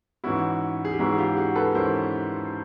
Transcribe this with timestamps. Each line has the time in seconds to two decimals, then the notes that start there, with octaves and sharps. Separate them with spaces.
0.24 G#2 E3 G#3 C#4 E4 F#4
0.85 G#4
0.92 G4
0.99 G#2 E3 G#3 C#4 E4 F#4
1.12 G#4
1.18 F4 G4
1.37 F#4 G#4
1.56 A4 B4
1.75 G#2 E3 G#3 C#4 E4 A#4 C5